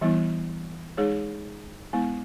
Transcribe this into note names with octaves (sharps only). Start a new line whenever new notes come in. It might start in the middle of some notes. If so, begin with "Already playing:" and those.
E3 G3 B3 E4
G#3 D#4 G#4 C#5
G#3 B3 E4